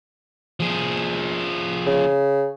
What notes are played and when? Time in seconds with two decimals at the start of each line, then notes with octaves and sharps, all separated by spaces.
0.60 F3 G#4
1.87 C#3